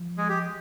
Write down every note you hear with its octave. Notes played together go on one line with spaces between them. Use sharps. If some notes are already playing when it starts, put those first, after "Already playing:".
Already playing: F3
G#3 G#4
G4